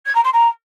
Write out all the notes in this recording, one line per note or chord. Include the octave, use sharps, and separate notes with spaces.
G#6
A#5
C6
A#5